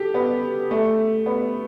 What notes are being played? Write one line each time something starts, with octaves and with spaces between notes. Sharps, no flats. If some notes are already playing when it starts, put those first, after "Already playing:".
Already playing: G4 A4
B3
A3
B3